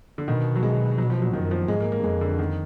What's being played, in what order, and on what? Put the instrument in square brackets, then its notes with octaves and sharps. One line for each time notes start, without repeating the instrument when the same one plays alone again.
[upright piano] D3
[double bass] B2 [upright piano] D#3
[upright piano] F#3
G#3
F#3
F3
F#3
[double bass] F#2 [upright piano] D#3
[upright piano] F3
[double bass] G#2 [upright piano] G#3
[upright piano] A#3
A#3
[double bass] F2 [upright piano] G#3
[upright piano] D3
D#3